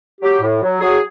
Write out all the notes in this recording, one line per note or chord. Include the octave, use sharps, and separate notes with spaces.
F#3 G4
A2
F#3
F#3 G#4